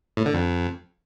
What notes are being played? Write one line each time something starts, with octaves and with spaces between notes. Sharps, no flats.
A2
D3
F2